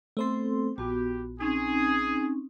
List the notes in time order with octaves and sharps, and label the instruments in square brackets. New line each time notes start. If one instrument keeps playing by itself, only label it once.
[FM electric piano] A3 C5 C6 [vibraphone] B3 C4 A4
[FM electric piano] A#1 [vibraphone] B3 F#4 [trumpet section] G4
[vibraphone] C4 C#4 D#4 [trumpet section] G#4